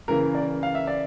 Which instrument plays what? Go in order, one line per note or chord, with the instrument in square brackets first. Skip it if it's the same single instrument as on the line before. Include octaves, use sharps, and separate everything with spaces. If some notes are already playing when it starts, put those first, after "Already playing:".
[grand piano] C#3 E3 A#3 A#4
D5
F5
E5
D5